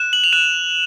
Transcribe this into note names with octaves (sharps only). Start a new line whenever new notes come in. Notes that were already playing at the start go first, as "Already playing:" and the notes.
Already playing: F#6 E7
F#7
F7
F#6 E7